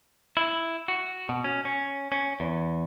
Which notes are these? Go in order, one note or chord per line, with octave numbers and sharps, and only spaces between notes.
E4
F#4
B2
C#4
C#4
C#4
E2